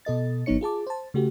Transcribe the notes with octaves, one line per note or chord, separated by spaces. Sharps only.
B2 A4 D#5 A6
G#1 F#3 B3 D#4 C#5 C#7
F4 G#4 A5 D6
C5 A5
C#3 A3 F#4 G4